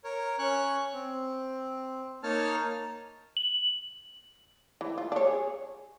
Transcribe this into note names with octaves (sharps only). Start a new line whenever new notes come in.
A#4 C#5
C#4 C#5 C#6 F#6
C4
A#3 D#4 C#5 A5 F6
F#7
E3
F4
D4 C#5
G#4